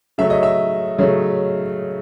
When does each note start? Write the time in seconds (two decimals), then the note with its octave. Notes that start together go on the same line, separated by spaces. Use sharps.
0.18 C#3 F#3 A3 E5
0.30 D#5
0.43 E5
0.98 C#3 F#3 A3